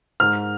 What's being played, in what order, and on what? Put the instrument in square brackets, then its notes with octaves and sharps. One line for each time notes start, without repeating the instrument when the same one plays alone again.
[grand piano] G#2 F6